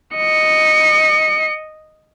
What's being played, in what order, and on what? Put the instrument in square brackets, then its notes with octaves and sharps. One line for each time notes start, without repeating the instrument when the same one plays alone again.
[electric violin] D#5 C#7